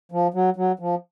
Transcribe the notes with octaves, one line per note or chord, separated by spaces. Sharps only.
F3
F#3
F#3
F3